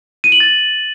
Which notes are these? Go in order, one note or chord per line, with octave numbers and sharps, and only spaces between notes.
D#7
F#7
A6